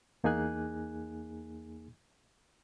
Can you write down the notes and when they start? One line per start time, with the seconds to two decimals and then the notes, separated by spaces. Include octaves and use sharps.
0.24 E2 A#3 D#4 G#4 G#5 F#6